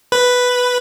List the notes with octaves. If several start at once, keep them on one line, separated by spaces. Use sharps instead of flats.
B4